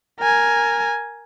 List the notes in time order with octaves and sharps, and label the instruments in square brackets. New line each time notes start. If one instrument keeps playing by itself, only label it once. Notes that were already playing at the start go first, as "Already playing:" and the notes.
[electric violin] A#4 G#5